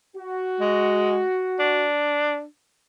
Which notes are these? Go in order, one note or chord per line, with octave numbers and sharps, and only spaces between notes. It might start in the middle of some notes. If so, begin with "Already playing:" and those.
F#4
G#3
D4